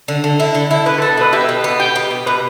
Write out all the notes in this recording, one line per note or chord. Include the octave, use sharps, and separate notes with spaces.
D3
D3
E4
D3
E4
B2 B4
A4
B3
B2 B4
G4 E5
B2
B3
G4 G5
B2
B2
B2 B4